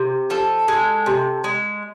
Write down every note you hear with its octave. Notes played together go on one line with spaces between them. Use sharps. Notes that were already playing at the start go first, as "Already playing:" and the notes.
Already playing: C3
F3 A4
G#3
C3
G#3